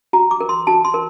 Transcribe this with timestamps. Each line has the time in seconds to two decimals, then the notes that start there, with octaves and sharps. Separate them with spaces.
0.13 F#4 A#5
0.31 D6
0.40 A#4
0.49 C6
0.67 F#4 A5
0.85 C6
0.94 A#4